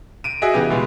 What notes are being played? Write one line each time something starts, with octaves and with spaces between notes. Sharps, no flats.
D7 D#7
F#4 G#4 D#5 E5
C#3 E3 B3 G4
B2 G#3